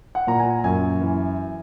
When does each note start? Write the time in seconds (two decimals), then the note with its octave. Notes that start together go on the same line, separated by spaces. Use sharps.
0.15 F#5
0.27 A#2 A#5
0.39 G#5
0.64 F#2 G#5
1.01 E3